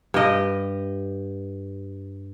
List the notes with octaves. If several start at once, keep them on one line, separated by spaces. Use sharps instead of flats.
G2 G4 D#5